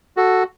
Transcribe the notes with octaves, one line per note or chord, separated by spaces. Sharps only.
F#4 A4